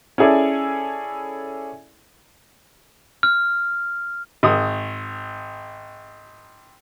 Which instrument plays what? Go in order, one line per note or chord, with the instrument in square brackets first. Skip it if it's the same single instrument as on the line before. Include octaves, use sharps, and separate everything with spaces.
[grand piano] C#4 E4 G#4 A4 D5
[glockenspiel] F6
[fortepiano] G#1 D#6